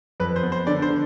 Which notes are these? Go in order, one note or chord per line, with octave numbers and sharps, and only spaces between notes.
F2 B4
C5
B3
C5
D3 D5
C5
D3